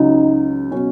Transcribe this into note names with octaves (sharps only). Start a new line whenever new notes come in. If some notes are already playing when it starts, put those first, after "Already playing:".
Already playing: C#2 C#3 F#3 D#4
B2 F#3 C#4